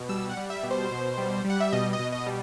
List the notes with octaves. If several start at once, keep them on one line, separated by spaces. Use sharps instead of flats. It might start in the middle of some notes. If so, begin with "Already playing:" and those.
Already playing: B2
G3 E6
F#5
G3
E5
B2
C5
B2
G3
G3
F#5
E5
B2 D#5
D#5
B2
D#5
G3